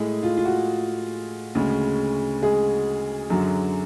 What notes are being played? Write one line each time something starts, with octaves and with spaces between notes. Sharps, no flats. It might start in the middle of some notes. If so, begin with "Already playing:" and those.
Already playing: A2 G#3 G#4
F4
F4
F#4
D2 C#3 G#3
G#3 G#4
F#2 D3 F#3